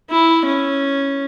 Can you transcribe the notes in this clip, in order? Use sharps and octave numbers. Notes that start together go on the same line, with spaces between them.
E4
C#4